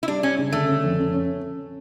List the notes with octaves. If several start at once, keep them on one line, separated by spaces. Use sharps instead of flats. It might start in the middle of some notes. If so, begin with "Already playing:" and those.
E4
G3 D4
G3 C#4
C#3
D3 A3
C#4
F2
C#4
C#4